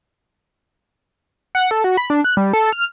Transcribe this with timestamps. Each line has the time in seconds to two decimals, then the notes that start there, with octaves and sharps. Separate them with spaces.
1.55 F#5
1.71 A4
1.84 F#4
1.97 B5
2.10 D4
2.24 F#6
2.37 G3
2.53 A4
2.73 F6